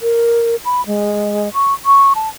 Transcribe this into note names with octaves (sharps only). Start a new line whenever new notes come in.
A#4
B5
G#3
C#6
C#6
A5